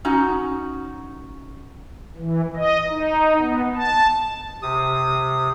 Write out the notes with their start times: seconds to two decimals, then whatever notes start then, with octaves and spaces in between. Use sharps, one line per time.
0.05 C#4 D#4 F#4
2.17 E3
2.56 D#5
2.89 D#4
3.39 B3
3.76 A5
4.62 C3 D#6